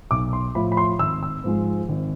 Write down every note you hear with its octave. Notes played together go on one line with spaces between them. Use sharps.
B1 D6
C6
A2 F3 B5
B5
C6
G#1 E6
E6
G#2 F3 G#3
G#1